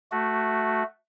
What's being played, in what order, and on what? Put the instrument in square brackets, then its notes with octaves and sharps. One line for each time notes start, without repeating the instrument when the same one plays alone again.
[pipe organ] A3 F#4